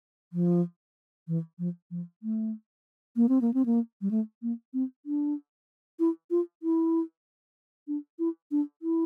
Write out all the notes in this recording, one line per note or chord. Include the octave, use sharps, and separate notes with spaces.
F3
E3
F3
F3
A3
A#3
C4
A#3
C4
A#3
G3
A3
A#3
C4
D4
E4
F4
E4
D4
E4
D4
E4